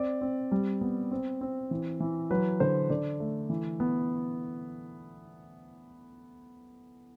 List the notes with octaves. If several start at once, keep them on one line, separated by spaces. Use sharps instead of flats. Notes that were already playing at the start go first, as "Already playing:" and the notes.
Already playing: C4 D5
C4
G3
B3
C4
C4
E3
E3
F#3 B4
D3 C5
D3 D5
A3
E3
B3